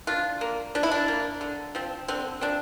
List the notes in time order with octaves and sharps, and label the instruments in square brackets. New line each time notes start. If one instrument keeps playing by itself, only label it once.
[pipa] F3 D4 F4
A#3
F3 D4
E4
D4
A#3
D3
F3 C4
D3 C4
F3 C4 D4